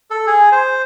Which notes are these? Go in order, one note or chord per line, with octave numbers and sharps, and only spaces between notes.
A4
G#4
C5